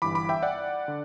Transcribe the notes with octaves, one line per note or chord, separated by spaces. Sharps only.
G1 G2 E3 B5 D6
B5 D6
E5 G5
D5 F#5
D3